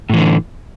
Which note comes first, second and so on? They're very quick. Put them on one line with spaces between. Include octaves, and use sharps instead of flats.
A2 E3 D3